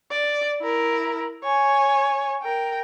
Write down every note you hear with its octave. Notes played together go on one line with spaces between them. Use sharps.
D5
E4 A#4
C#5 G#5
A#4 G5